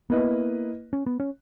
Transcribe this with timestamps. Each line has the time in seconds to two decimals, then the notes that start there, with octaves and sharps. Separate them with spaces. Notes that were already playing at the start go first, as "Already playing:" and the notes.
0.10 A#3 B3 E4 B4 D#5
0.93 C#4
1.06 B3
1.20 C#4